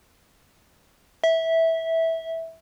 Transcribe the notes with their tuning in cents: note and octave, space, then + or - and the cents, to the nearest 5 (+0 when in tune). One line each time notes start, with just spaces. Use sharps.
E5 -15